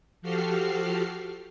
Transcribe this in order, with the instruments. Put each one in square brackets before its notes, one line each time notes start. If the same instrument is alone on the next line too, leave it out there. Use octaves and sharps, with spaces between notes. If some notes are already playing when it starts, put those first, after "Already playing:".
[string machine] F3 F#4 G4 A4 F6 C7